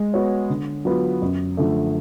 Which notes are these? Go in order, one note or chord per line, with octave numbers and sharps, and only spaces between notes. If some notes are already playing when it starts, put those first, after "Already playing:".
Already playing: G#3
B3 F#4 C#5
D3
F#3 B3 F4
F#2
D3 F3 A3